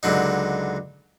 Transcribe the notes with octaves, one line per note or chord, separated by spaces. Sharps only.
C#2 D3 F#3 D#4